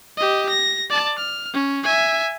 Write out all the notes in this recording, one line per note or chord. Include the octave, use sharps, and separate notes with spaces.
G4 D#5
A#6
D5 A5
F6
C#4
E5 G#5